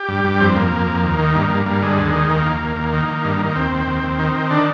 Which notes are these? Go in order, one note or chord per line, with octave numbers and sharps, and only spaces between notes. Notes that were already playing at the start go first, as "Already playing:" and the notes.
Already playing: G4
G2
G2
F2 C4
F2 A#3
F2
F2
D#2
D#3
G2 A#3
G2
G2 A#3
D3 G#3
D#2
D#3
D#2 A#3
D#2
D#2
D#2
D#3
D#3
G2
D#3
A#3
D#2 C4
D#2
D#2
D#2
D#3
D#3
D3 D4